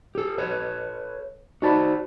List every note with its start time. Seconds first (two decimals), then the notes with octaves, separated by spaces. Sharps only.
0.15 G4 A4
0.38 A4 B4 C#5
1.62 D#4 F#4 C5 D5 A5 B5